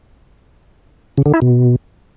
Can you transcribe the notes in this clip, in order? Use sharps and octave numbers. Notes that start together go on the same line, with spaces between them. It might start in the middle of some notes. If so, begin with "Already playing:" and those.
C#3
D3
E4
B2